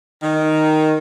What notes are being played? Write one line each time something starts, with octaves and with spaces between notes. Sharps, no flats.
D#3